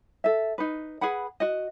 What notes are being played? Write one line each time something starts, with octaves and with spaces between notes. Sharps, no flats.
A4 E5
D#4 B4
G#4 B4 F#5 B5
F#4 D#5